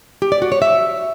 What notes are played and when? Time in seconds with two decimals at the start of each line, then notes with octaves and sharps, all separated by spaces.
0.22 G4
0.32 D5
0.42 F#4
0.52 C#5
0.62 E5